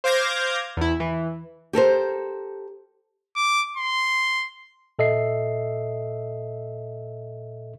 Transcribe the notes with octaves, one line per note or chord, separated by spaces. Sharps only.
C5 F5 D6 G6 G#6 A#6
E2 E4
E3
G4 A4 A#4 C5
D6
C6
A#2 A4 D#5 E5 C7